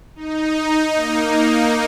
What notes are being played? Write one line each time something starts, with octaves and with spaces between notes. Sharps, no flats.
D#4
A#3